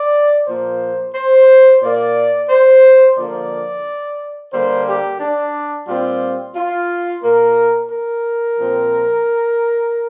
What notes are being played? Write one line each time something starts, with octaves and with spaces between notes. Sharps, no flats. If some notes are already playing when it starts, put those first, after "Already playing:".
Already playing: D5
A#2 F3 A#3 C5
C5
A#2 A#3 D5
C5
D3 F3 A#3 D5
D3 G3 A#3 C5
G4
D4
A#2 G3 C4 F4
F4
A#2 A#3 A#4
A#4
A#2 F3 C4